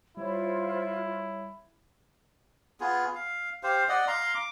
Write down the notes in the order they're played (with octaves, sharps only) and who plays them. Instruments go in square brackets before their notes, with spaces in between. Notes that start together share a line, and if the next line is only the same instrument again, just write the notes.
[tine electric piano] G3 C#5 [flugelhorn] E4 [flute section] F4 C5
[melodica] B3 F4 G#4
F5
G4 C5 F5
D5 D#5 F#5
F5 A#5 C6
D6